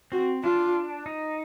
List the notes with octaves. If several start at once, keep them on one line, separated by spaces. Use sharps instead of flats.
C4 F#4
D4 F4
D#4